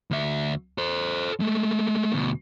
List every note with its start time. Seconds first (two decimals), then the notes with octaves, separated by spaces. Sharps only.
0.11 D2 E5
0.78 A4 C5
1.40 G#3 A3
2.14 D2 B2